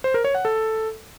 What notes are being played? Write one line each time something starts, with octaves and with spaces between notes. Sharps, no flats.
C5
A#4
C#5
F#5
A4